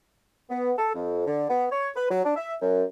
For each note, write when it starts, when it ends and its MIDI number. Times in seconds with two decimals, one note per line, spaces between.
0.50 0.71 59
0.78 0.89 69
0.95 1.24 41
1.26 1.44 50
1.49 1.65 59
1.71 1.89 73
1.96 2.08 71
2.11 2.24 54
2.24 2.36 62
2.36 2.55 76
2.62 2.84 42